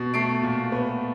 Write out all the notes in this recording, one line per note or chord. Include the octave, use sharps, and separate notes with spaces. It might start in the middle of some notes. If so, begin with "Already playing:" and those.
Already playing: B2
A3 C7 D7
A#2
B3